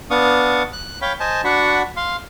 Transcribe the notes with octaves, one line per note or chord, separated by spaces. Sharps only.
B3 D4 F5 C#6 D#6
F#6
C#5 F5 G5 B5
C5 D#5 G#5 A5
D4 F#4 F#5 B5 C#6
F5 C6